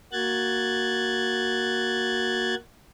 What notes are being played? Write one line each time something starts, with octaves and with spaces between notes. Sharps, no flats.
A#3 F#4 F#6 G#6 A6